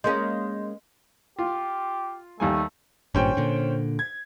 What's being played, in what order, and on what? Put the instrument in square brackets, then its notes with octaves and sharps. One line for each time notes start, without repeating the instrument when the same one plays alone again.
[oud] G#3 A#3 C#4 [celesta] D#5 C6 G6
[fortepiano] F4 [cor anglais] G4
[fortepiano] D#2 G3 G#5 [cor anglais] A3
[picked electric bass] G#1 G2 A#2 [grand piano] C#4 C5 G5
[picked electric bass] A#2 D3
[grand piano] G#6